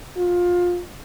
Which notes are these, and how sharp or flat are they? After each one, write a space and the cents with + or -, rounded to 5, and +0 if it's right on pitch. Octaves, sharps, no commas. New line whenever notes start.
F4 +20